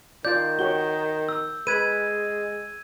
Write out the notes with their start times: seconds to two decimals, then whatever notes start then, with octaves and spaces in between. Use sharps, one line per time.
0.25 D#3 F4 D5 G6
0.59 F#4 G4 C#5 G7
1.29 E6
1.67 G#3 B4 G#6 D#7